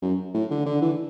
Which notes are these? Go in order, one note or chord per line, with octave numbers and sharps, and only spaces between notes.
F#2
A2
D3
D3
E3